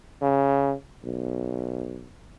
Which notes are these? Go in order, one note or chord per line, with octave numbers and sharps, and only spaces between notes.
C#3
B1